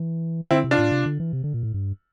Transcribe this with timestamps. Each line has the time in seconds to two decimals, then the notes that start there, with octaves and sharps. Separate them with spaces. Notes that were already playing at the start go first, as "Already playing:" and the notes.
Already playing: E3
0.51 D3 C4 E4
0.64 C3
0.71 D4 F4
0.78 A2
0.92 C3
1.06 D3
1.20 E3
1.33 C3
1.44 D3
1.54 A#2
1.63 A2
1.74 G2